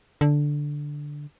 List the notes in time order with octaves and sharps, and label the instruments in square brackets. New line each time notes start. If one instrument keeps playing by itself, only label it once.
[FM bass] D3